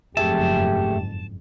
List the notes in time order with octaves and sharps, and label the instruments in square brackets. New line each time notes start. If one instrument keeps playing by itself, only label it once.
[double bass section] F#1 F2 G#2 [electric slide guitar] A3 G#4 E5 [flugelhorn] G4 [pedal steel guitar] A5